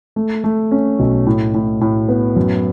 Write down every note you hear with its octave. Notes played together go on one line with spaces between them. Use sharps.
A3
A3
C#4
B1
A2
A2
A2
B3
F#2